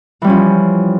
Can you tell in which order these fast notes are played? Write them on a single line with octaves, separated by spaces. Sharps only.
E3 G3 C#4 F3